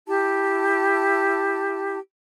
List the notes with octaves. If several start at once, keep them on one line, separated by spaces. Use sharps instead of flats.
E4 G4 A5